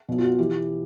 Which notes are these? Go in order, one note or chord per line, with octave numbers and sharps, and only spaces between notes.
B1 B2
F4
F#4
E3 G4